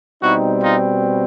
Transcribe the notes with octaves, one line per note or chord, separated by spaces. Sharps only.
B2 G3 C4 D#4 E4 F#4
D#4 F4